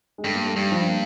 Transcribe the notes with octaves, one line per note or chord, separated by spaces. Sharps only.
G#3
G2 A3
A#3
A3
G2 G3
F3
A#3